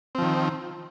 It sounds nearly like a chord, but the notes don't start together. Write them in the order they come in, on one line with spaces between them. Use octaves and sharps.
C4 F3 D#3